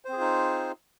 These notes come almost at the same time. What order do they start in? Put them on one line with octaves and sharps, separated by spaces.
C5 C4 G#4 F4 D#4